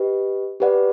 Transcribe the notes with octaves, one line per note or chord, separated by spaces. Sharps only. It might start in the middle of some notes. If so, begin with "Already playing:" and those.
Already playing: G4 B4 D#5
G4 B4 D5 F#5